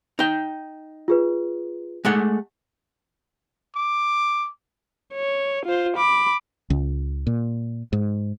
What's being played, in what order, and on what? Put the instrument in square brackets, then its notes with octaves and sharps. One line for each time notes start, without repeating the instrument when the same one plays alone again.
[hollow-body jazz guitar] D#4 G5
[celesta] F4 G#4 B4
[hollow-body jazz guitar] G#3 A3 F#5
[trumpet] D6
[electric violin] C#5
F4 C5
B5 D6
[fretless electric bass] C#2
A#2
G#2